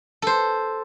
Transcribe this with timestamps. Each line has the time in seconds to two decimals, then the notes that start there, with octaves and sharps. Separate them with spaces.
0.22 A4 C5